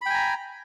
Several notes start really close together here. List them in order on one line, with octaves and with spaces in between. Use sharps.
B5 G5 G#5 A#5